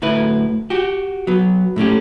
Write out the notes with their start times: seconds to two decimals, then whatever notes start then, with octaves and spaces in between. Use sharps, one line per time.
0.02 D2 A2 E4 B4
0.70 F#4 G4
1.27 F#3 B3
1.76 A2 A3 C#4 G4